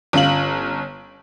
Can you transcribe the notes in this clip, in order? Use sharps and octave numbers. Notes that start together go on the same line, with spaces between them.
G1 C#4 F4 F#7